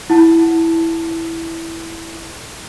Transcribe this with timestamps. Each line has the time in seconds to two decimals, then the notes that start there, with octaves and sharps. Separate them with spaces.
0.10 E4 F#5 A5